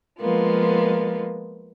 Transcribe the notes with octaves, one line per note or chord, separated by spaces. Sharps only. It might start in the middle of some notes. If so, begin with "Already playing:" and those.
F3 G#3 A#3 B3 F4